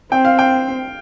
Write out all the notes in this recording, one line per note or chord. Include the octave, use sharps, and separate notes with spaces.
C4 G5
F5
G5